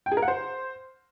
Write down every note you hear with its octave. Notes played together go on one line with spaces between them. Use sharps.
G5
G#4
A#4
F#5
C5